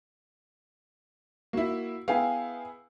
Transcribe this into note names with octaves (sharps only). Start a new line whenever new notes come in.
A#3 E4 F#4
B3 E4 G#4 F5 G5 G#5